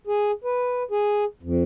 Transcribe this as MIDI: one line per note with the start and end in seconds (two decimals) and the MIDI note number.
0.07 0.31 68
0.44 0.83 71
0.91 1.24 68
1.43 1.63 41